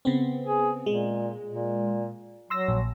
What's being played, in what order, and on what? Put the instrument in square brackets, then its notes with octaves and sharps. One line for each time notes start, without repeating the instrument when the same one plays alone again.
[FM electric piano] C#3 B3 C4
[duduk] G#4
[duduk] A#2 [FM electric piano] G#3
[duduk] A#2
[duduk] F#3 [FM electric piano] C6 E6 A#6
[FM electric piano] A#1